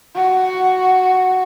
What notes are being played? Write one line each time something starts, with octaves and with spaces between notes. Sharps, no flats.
F#4